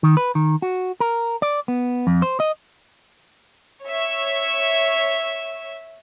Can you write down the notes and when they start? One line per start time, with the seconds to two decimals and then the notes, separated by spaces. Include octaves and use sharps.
0.03 D#3
0.17 B4
0.35 D#3
0.62 F#4
1.00 A#4
1.42 D5
1.68 B3
2.07 F2
2.22 C5
2.40 D#5
3.84 C#5 E5